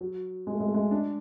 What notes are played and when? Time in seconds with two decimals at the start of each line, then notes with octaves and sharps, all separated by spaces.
0.01 F#3
0.47 G#3
0.54 A3
0.60 G#3
0.68 A3
0.74 G#3
0.91 D4